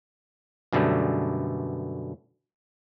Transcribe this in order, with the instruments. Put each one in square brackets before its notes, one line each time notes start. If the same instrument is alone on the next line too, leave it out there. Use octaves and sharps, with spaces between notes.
[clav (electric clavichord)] F#2 B2 D3 G3 A3